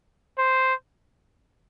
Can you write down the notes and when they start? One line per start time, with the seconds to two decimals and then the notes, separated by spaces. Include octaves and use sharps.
0.38 C5